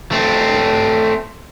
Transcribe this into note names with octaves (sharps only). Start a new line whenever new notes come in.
A3 C4